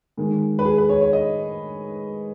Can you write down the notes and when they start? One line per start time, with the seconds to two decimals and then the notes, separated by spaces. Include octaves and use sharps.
0.17 G#2 D#3 G#3
0.59 B4
0.65 G#4
0.78 B4
0.89 C#5
1.01 C#5
1.13 D#5